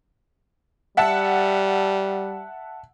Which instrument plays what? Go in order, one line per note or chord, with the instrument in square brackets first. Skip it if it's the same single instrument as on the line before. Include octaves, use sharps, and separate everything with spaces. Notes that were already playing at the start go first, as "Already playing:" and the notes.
[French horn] G3 [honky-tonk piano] E5 F#5 A5